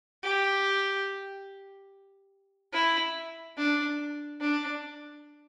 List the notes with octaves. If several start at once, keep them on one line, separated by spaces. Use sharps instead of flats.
G4
E4
D4
D4